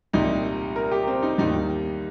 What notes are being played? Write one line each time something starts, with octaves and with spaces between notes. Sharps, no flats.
C2 A#2 G3 D#4
A#4
G4
C4
D#4
D#2 D#3 G3 D#4